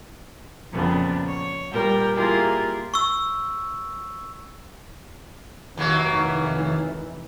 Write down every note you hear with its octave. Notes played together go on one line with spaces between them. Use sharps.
F2 A#2 C#3 B3 C4 D4
C#5
A#2 G3 A#4 G5
A#3 E4 F4 G4 G#4 A#4
C#6 E6
F1 D#2 D#3 E3 F#3 A#3